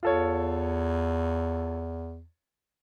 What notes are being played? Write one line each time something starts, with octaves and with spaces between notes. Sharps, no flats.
E2 F4 A4 C#5